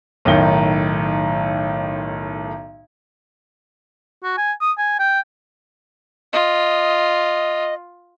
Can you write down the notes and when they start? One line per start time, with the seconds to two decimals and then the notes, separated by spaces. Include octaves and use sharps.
0.25 B1 A2 D#3 G7
4.23 F#4
4.37 G#5
4.61 D#6
4.78 G#5
4.99 G5
6.33 F4 D#5